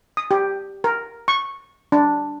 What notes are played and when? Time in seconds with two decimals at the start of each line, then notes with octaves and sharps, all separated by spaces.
0.17 D#6
0.31 G4
0.84 A#4
1.28 C#6
1.92 D4